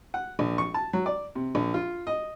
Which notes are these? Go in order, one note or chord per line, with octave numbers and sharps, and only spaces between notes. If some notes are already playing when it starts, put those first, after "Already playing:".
F#5
A#1
C#6
A5
F#3
D5
C3
A#1
F4
D#5